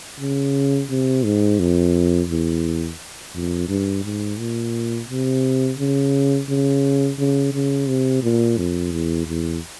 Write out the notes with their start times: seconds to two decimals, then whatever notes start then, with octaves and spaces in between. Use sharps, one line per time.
0.20 C#3
0.90 C3
1.25 G#2
1.60 F2
2.29 E2
3.34 F2
3.69 G2
4.04 G#2
4.39 A#2
5.09 C3
5.78 C#3
6.48 C#3
7.18 C#3
7.53 C#3
7.88 C3
8.23 A#2
8.57 F2
8.92 E2
9.27 E2